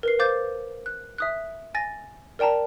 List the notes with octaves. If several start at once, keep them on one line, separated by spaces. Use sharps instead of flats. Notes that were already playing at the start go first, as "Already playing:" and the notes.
A#4 B4 C7
C5 F5 D6 G6 A6
F#6
E5 D#6 F#6
G#5 A6 A#6
A#4 D5 G5 A5 A#5